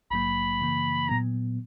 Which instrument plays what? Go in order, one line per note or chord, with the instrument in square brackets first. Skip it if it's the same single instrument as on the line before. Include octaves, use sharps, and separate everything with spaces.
[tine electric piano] A#1 G#2 F#3 A#3 [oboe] B5
[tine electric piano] F#2 C#3 E3 A#3
[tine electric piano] A#2 F#3 B3 [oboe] A#5